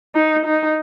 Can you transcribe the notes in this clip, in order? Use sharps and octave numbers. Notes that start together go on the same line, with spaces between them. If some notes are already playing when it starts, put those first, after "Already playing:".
D#4
D#4